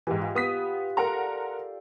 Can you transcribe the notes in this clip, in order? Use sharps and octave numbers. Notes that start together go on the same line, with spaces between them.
G#2 E3 G4
F4
B3 D#6 B6
A4 A#4 D5 F#5 A#5 C6